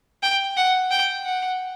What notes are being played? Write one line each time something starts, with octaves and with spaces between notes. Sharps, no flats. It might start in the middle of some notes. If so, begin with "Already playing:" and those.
G5
F#5
G5
F#5